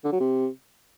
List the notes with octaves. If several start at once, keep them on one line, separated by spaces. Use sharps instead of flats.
D3
F#3
C3